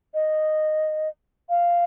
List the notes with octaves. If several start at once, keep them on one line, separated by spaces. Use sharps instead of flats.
D#5
F5